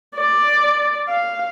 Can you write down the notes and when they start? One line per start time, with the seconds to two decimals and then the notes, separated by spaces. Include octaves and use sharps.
0.15 D5
1.09 F5